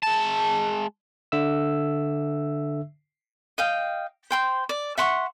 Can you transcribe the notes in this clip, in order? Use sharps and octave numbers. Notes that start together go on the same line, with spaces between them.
G#3 A5
D3 E5 E6
D#5 F5 G5
C5 G5 C6
D5
E5 F#5 C6 C#6